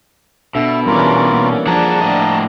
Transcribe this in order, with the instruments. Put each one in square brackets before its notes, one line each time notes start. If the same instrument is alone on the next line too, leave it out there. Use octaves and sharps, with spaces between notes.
[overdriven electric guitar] B2 [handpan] D4 A4 [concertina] E5
[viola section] E3 C#4 D5 [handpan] G3 [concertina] F4 A#4
[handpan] A#3
[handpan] F3 [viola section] D4 [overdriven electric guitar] G#4 F#5 [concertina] A5 A#5
[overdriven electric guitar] A2 D#5